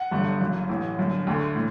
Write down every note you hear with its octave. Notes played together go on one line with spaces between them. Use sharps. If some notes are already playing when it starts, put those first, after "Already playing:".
Already playing: F#5
G1 G2 D3 F#3 A3
F#1 F#2 C#3 F#3
A1 A2 E3
G1 F#2 D3
D2 D3 A3
A2